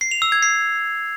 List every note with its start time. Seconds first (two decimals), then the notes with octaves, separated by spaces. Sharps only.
0.01 C7
0.11 F7
0.22 E6
0.32 G#6
0.43 C7